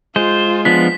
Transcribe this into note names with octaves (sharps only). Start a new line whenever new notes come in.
G#3 F4 C5
F3 B3 D4 B6